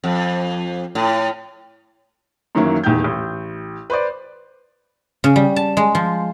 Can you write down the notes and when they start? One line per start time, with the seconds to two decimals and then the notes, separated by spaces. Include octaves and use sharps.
0.04 F2
0.95 A2
2.55 F#2 D#3 E3 F#3 A#3
2.84 D#1 E2 D#3 G5 G6
3.04 A1
3.90 B4 C5 D5
5.24 C#3
5.36 G3
5.56 A5
5.77 G#3
5.95 F3